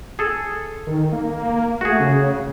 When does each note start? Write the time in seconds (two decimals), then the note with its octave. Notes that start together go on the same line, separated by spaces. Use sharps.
0.19 G#4 A4
0.87 D#3
1.12 A#3
1.81 A3 F#4 G#4
2.00 C#3